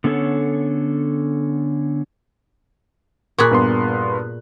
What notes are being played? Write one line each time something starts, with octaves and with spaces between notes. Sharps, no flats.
D3 B3 C#4 A4 C#5
A#2 G#4 B5 C#6 F#6
G2 B3 C6